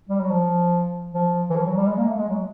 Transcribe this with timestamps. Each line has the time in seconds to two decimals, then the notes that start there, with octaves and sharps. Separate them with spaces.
0.09 G3
0.20 F#3
0.30 F3
1.14 F3
1.50 E3
1.56 F3
1.66 F#3
1.77 G3
1.87 G#3
1.97 A#3
2.07 A3
2.18 G#3
2.29 F#3